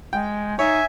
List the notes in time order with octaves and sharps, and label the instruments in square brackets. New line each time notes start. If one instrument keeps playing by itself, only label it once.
[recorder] G#3 [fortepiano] G5
[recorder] D#4 [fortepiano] C#5 [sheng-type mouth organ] E5 G#5